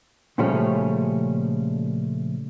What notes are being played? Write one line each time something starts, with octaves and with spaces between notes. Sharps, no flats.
A#2 C#3 F3 G3 A3 C#4